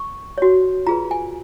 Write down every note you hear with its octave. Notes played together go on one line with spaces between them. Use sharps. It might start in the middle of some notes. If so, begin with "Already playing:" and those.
Already playing: C#6
F#4 C#5
F4 G#4 B4 A#5
G#5